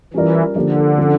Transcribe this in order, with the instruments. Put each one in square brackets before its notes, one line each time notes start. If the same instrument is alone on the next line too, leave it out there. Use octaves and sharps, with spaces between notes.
[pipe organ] E3 [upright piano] G3 C#4 F4 A#4 D5
[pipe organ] D3 [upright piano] F3 A#3 D4 G4 D5
[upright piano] F3 C#4